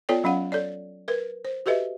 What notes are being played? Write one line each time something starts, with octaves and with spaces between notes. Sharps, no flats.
B3 F4 A4 C#5 D5 G5
F#3 C#4 F5 F#5
A4 C#5 D5
A#4 B4
C5
F#4 G4 A4 B4 D#5 E5